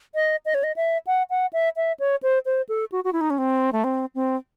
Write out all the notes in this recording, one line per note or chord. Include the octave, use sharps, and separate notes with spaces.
D#5
D#5
C#5
D#5
E5
F#5
F#5
E5
E5
C#5
C5
C5
A4
F#4
F#4
E4
D#4
C#4
C4
A3
C4
C4